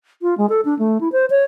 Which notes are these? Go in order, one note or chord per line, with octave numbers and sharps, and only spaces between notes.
F4
G#3
A4
D4
A3
E4
C5
C#5